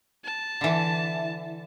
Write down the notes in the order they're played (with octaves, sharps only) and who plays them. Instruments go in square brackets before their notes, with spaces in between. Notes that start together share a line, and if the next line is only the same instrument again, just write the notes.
[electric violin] A5
[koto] D3 E3